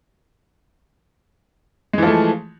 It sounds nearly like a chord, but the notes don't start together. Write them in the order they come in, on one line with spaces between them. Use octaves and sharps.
G#3 E3 F3 A3